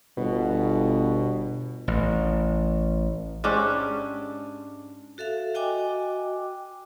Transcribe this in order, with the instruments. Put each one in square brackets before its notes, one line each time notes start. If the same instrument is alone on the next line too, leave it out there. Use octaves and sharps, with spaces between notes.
[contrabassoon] G1 [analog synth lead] B2
[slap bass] A1
[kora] G#2 C#4 D4 G4
[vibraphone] F#4 A4 E5 F5
F#4 D#5 G5 G#5 D6